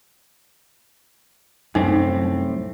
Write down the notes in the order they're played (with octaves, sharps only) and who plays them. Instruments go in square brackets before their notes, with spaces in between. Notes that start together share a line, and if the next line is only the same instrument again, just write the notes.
[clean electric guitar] C2 A2 C4 [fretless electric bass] F#2 [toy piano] D#4